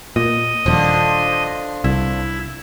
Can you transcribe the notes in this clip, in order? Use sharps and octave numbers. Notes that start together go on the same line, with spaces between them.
A#2 D#5
D#1 D3 F3
C2 E4